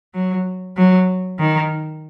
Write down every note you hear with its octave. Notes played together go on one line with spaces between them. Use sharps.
F#3
F#3
D#3